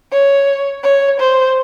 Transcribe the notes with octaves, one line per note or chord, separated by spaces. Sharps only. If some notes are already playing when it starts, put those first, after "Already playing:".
C#5
C#5
C5